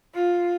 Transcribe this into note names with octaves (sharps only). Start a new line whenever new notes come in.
F4